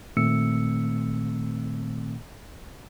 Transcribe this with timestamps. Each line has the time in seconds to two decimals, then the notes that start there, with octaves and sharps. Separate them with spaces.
0.17 A#2 D#3 A3 C4 E6 C#7